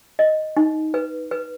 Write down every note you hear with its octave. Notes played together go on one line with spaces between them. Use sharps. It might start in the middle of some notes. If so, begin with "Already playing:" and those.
D#5
D#4
B4
B4